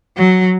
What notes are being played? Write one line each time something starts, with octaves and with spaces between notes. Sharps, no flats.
F#3